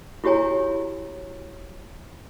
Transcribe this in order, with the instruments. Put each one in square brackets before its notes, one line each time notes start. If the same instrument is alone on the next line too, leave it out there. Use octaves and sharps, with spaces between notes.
[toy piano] E4 F#4 G4 C#5 G#5 A#5